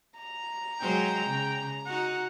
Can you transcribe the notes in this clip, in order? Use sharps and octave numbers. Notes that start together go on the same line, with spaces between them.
A#5
F#3 G#3 C5 G5
C#3
D#4 F#4 F#5